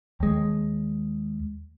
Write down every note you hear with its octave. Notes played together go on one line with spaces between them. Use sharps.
D#2 G#3